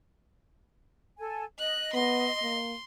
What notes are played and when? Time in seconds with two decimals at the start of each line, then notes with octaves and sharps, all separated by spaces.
1.18 A4 G#5
1.59 D#5 F#6
1.94 B3 C6
2.42 A#3